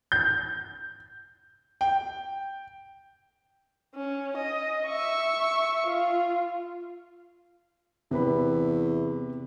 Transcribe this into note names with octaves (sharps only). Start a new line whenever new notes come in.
G6
G5
C#4
D#5
E5 C#6
F4
E2 C3 B4 B5